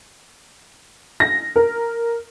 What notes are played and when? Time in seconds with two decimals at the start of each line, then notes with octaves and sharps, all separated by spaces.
1.20 A#6
1.56 A#4